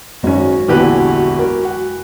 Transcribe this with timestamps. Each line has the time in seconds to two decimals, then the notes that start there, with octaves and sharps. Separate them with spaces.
0.23 G#1 F#2 G#3 C#4 F#4
0.68 A#1 E2 D3 E3 G4 B4
1.39 A#4
1.65 F#5